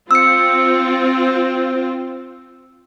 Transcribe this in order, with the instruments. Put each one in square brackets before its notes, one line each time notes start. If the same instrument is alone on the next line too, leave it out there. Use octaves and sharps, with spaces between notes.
[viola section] C4 F4 [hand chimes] E6 C#7